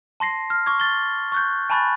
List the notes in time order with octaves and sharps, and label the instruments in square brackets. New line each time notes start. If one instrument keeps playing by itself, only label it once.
[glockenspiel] A5 C6 A#6 C7
F6
C#6 D6 F6 G#6
A6 G7
C#6 F#6 G6
G#5 A5 B5 C#6 F#6 A6